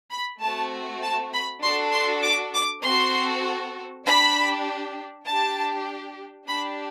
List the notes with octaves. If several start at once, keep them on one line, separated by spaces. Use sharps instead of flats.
B5
A3 C4 F#4 A5
A5
B5
D4 F#4 A4 C6
C6
D6
D6
C4 F#4 A4 C6
D4 G4 B5
D4 G4 A5
D4 G4 B5